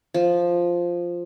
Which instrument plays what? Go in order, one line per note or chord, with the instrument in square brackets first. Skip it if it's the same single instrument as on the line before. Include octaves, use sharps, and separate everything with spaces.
[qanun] F3